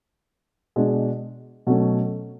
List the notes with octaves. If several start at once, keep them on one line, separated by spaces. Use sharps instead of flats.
B2 G#3 D4
B2 F#3 A3 C#4